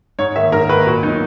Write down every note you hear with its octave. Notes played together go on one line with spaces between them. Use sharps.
G#2 C#5
D#3 A#3 E5
G#2 A#4
D#3 A#3 B4
A#2 F#4
F#3 B3 D#4